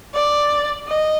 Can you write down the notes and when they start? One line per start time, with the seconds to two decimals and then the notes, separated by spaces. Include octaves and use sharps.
0.14 D5
0.88 D#5